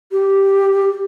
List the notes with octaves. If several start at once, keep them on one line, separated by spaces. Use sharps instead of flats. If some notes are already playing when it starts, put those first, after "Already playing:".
G4